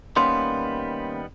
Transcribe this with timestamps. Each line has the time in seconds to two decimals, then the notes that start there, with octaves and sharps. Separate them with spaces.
0.16 D#3 G3 A#3 B3 C#4 F5 C6